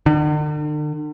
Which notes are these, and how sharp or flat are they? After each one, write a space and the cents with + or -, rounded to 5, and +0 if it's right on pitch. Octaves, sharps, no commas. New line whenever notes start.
D3 +45